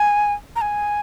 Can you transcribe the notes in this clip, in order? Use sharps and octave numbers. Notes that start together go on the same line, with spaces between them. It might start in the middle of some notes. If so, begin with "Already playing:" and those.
Already playing: G#5
A#5
G#5